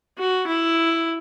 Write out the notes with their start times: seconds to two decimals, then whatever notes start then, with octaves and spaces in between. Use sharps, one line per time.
0.18 F#4
0.47 E4